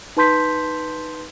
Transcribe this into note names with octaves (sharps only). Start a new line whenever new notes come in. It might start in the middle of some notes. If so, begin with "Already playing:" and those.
D#4 B4 A5 C6 G6 B6